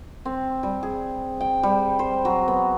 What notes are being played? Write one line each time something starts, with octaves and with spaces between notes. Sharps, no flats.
C4
G3
G#4
G5
G3
C5
F#3
B3